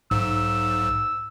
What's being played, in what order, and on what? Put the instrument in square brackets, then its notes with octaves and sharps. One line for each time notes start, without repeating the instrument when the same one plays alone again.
[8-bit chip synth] B1 G#2 [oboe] E6